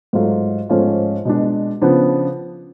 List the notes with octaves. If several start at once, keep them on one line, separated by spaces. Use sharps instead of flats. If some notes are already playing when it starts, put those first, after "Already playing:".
G#2 F#3 A3 F4
G#2 F3 A3 C#4 F4
B2 G#3 D4
C#3 F3 B3 D4